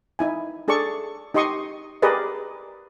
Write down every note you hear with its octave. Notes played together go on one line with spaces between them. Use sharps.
D#4 E4 G#5
D4 G#4 A4 D5 C#6
D#4 G4 D#5 C6 C#6 D#6
G4 G#4 A#4 B4 D5 D#5